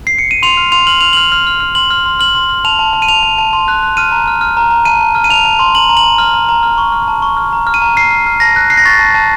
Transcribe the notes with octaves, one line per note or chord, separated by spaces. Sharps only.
C7
C#7
D#7
C6 F7
F6
C6 F7
F6 F#7
F6 F7
F6 F#7
F6
F6
F6
C6 F#7
F6
C6
F6 F#7
C6
F6
A5 F7
A5
A5
D#7
A5 F7
A5
A5
C6
F#6
F#6
F6 D#7
A#5
F6
F6
A#5
A#5
A5 D#7
A5
F6
D#7
A5 F7
A5
C6
A#5 F#7
A#5
F#7
A#5
F6
A#5
A#5
F6
C#6
F6
A5
C#6
F6
A#5
F6
D#7
A#5
F6 C7
F6
F6
A5 A#6
F#6
F#6 C7
A#6
C#6 A6
A5
A5